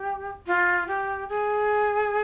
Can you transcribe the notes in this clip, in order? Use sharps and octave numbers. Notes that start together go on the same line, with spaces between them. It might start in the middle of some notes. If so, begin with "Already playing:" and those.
Already playing: G4
F4
G4
G#4